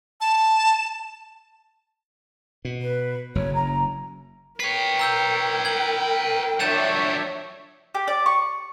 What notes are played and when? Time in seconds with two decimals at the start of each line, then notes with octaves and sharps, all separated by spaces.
0.21 A5
2.65 B2
2.82 B4
3.35 F#1 F#2 C#5
3.54 A#5
4.60 A#4 B4 C#5 G5 C7
4.99 A#5 E6 G6
5.65 G#6 F#7
6.60 F3 F#3 D4 C#5 E5 G6 A6 E7
7.95 G4
8.08 D5
8.26 C#6